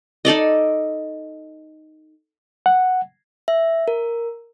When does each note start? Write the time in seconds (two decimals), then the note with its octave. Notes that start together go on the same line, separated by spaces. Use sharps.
0.25 D#4 A4 D5 D#5
2.66 F#5
3.48 E5
3.88 A#4